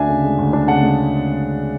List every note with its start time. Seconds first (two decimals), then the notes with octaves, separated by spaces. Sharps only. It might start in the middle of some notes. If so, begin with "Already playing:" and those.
Already playing: D2 D4 E5 G#5
0.09 C#3
0.24 G#3
0.38 D2
0.53 D4
0.68 C#3 F#5 A5
0.83 G#3